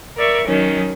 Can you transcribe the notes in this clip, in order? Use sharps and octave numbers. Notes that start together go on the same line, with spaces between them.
A#4 D5 E5 C#6
D#3 F#3 C#4